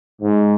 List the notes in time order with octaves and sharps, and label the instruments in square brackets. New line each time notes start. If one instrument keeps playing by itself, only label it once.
[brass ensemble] G#2